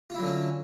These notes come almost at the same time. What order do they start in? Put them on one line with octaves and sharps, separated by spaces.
F4 E4 F#3 D3 C#4